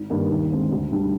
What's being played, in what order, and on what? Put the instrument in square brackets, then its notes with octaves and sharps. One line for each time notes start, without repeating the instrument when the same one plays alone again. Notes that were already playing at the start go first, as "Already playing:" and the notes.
Already playing: [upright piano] G#1
G2 D#3 A#3 D#4
D#2
D3 G#3 C4
D2
D3 G3 D4